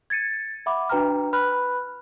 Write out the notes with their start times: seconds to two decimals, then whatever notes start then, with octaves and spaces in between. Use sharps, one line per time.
0.10 G#6 A6 C#7 D#7
0.66 E5 F#5 B5 D6
0.89 D4 F#4 B4 G5 A#5 F6
1.33 B4 B5 F6 F#6